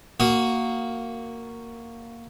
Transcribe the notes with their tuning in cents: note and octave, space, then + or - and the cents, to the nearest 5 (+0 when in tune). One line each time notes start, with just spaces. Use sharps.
A#3 -10 F#4 +0 D#6 +25